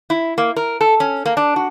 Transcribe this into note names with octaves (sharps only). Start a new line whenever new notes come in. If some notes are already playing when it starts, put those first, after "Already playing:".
E4
A#3
A#4
A4
C#4
A#3
D4
F#4